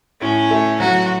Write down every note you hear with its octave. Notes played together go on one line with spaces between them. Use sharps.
A2 C#4
A3
F#3 F#4